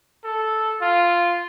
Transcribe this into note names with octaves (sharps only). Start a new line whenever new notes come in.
A4
F4